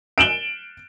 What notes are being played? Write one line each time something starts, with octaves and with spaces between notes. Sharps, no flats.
D7 E7 F#7 G7